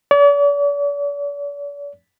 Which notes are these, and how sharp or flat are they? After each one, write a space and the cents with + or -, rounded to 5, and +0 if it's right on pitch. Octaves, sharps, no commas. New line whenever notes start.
D5 -45